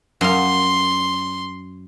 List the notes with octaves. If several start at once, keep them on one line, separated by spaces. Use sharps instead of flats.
F#2 F5 C6